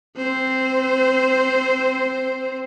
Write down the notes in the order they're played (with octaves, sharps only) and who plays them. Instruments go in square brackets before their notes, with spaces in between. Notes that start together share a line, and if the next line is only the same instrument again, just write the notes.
[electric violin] C4 C5